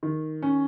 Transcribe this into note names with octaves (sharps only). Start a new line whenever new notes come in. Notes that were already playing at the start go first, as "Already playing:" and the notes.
D#3
C#4